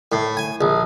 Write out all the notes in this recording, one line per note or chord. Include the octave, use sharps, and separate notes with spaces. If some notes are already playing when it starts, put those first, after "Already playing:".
A2
G#5
A#1